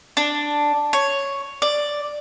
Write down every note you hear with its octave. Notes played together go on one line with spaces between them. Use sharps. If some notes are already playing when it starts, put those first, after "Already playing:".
D4
C#5
D5